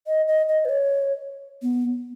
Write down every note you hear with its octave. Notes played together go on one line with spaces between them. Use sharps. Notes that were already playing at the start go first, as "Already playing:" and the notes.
D#5
D#5
D#5
B4
C#5
B3